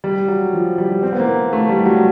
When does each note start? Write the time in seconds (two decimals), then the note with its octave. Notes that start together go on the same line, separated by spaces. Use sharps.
0.04 G3
0.28 F#3
0.53 F3
0.78 G3
1.03 C4
1.13 B3
1.20 A#3
1.53 A3
1.69 G3
1.86 F#3